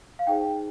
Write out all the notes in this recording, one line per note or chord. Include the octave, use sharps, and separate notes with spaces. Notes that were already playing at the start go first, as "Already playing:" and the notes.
F5
D#4 G#4 C5 G5